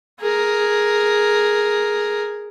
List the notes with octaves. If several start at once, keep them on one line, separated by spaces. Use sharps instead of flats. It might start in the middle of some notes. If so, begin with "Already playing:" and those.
G#4 A#4